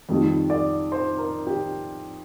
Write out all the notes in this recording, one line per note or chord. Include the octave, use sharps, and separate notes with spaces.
F2 D#3 G3
D5
C5
A#4
G4